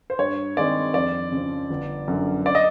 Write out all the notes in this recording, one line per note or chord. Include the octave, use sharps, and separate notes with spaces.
C5
G2 C#5
D#3 G#3 C4 D5
F2 D5
C#3 F3
G1
F#2 D3
D5
D#5